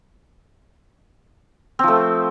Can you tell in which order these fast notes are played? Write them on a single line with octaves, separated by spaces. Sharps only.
C4 F3 A3